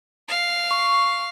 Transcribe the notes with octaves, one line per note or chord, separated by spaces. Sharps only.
F5
C#6